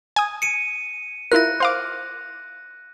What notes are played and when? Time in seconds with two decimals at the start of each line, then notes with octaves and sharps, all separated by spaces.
0.16 G#5 D#6
0.42 C#7 D#7
1.32 E4 F4 A#4 F#6 A#6
1.60 C5 F5 D6